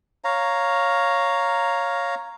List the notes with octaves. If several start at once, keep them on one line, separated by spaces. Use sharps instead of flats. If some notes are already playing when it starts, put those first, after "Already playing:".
C#5 F5 A#5